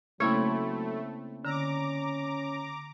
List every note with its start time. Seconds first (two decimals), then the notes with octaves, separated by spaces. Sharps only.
0.20 C#3 F#3 A3 A#3 C4 C#4 E4 C#5
1.45 D3 C#4 A#5 D6 E6